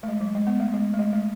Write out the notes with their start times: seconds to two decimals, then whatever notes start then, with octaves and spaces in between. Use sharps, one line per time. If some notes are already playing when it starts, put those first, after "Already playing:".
0.03 A3
0.08 G#3
0.21 F#3
0.35 G#3
0.47 B3
0.60 A3
0.74 G#3
0.94 A3
0.99 G#3
1.13 A3